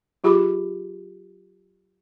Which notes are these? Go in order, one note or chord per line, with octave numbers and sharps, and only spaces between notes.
F#3 F4 G4 G#4 B5 D6